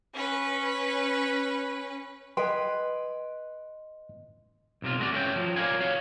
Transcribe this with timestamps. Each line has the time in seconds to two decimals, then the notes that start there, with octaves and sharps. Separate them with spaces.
0.13 C#4 B4
2.37 B4 D#5 G5 C6
4.82 B1 C3 F4
4.99 G#3 A3 F#4 D5
5.12 A3 C#4 D5 G5
5.36 F3 F#3
5.56 A#4 B4 C#5 D5 F5 G#5
5.81 F#4 C#5 F5